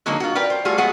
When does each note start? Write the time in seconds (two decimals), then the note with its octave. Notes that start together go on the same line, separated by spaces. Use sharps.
0.06 D3 F#3 G#3 A#3 D#4
0.20 F4 F#4
0.35 A#4 B4 D5 G5
0.50 C5
0.65 G3 A3 F4 F#4 G#4
0.78 F#3 G#3 B3 G#4 F#5